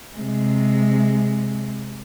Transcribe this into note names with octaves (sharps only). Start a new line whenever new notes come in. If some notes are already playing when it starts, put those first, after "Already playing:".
C3 G#3